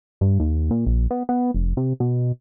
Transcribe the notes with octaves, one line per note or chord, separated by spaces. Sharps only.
G2
D#2
A#2
A#1
B3
B3
F1
C3
B2